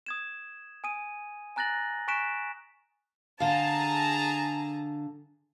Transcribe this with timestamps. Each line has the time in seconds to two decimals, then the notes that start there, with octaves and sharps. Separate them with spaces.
0.06 D#6 G#6 E7
0.84 G#5 D#6 D#7
1.56 G#5 A#5 F#6 A6 A#6 F#7
2.08 G#5 C#6 F#6 B6 D7 E7
3.40 D3 G#4 F5 A5 A#5